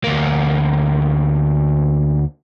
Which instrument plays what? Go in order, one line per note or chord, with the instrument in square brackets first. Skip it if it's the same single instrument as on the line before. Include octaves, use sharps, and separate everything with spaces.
[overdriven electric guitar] D2 A#3